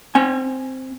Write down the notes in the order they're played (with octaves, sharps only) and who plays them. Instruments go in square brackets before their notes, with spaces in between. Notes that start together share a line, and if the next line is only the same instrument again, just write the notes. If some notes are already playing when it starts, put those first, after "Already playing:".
[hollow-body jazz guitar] C4 G#5